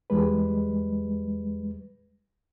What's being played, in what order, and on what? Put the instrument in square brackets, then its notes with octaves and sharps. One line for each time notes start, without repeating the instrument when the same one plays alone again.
[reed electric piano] E2 G3 G#3 B4